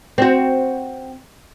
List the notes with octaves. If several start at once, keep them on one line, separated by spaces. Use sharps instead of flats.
C4 F#4